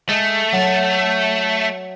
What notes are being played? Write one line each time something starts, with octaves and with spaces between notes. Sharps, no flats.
G#3 A3
F#3